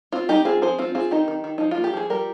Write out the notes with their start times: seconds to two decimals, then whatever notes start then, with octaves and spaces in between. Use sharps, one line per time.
0.12 C4 F4
0.29 G3 D#4 G4
0.45 C4 F4 G#4
0.62 F3 G#4 C5
0.78 C4 F4
0.95 C4 F4 G#4
1.11 D#3 D#4 G4
1.28 D#3
1.44 D#3
1.58 F3 D#4
1.71 F4
1.77 A#3
1.84 G4
1.93 F3 G#4
2.10 G3 G4 A#4